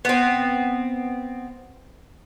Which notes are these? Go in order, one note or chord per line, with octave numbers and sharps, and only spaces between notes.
B3 C4